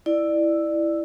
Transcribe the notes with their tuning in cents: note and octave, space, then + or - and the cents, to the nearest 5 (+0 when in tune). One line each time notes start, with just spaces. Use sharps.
E4 +0 D5 +20 E6 +0